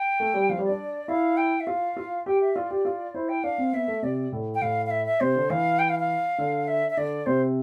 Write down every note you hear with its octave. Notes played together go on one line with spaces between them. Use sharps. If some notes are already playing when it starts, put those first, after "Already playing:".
Already playing: G5
A3
G3
F3 F5
G3
D4 D5
E4 F5
G5
E5
F4 F5
F4
G4 G5
E5
F4 D5
G4
F4
E4 C5
G5
D4 F5
C4
B3 E5
A3
C3 D5
A2
G5
A2 F5
F5
E5
E5
C3 C5
D3
E3 F5
G5
F5
F5
D3
E5
E5
D3 D5
C3 C5